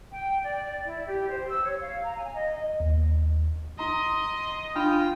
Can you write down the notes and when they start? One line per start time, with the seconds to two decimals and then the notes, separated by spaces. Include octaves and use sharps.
0.11 G5
0.43 D5
0.85 E4
1.06 G4
1.29 C5
1.48 E6
1.64 C#5
1.81 F5
2.02 A#5
2.16 G#5
2.33 D#5
2.80 D#2
3.79 E4 D#5 A#5 C6
4.75 D4 F4 G5 B5 C6